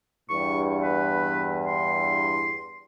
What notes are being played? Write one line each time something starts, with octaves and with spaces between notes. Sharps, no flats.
E2 G2 C#6
B4
C6